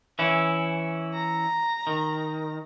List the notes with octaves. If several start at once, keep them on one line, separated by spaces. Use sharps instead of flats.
E3 C#4 E4
A#5
D#3